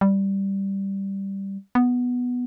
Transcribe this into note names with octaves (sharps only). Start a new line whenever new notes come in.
G3
B3